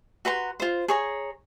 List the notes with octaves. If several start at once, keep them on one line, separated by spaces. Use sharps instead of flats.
F#4 B4 A#5 C6
F4 C5
G#4 C#5 A#5